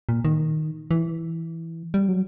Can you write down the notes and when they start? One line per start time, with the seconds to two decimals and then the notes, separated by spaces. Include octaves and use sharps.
0.09 A#2
0.25 D#3
0.91 E3
1.94 G3
2.09 F#3